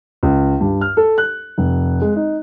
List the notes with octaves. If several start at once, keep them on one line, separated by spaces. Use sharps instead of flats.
C#2
G2
F6
A4
F#6
F1
G#3
D#4